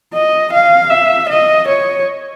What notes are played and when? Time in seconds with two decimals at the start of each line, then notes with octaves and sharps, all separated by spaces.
0.14 D#5
0.53 F5
0.91 E5
1.29 D#5
1.68 C#5